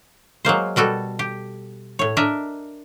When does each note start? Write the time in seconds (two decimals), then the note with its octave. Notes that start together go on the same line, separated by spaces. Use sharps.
0.45 F#3 G#3 A#3 C5
0.76 B2 G3 F#4 A4
1.19 G4
1.99 A2 C#5
2.17 D4 A#4 D#5 E5